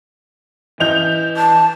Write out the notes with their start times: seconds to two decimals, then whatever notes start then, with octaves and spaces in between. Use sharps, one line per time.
0.80 E3 E4 D#5 G6 F7
1.37 A5